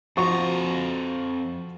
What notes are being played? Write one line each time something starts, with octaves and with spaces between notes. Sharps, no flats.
F2 F3 F#4 A#5 C#6